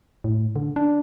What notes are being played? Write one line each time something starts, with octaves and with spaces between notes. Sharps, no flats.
A2
D3
D4